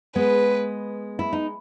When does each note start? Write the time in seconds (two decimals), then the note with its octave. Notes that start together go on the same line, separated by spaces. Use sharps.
0.16 G#3 B3 B4
1.19 E4
1.33 D#4